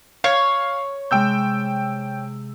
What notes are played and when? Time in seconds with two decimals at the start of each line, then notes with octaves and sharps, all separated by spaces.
0.24 C#5 F5
1.11 C3 G#3 G5 E6 G6